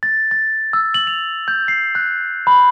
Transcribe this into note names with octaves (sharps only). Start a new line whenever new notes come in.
A6
A6
E6
F#7
F7
G6
C7
F#6
B5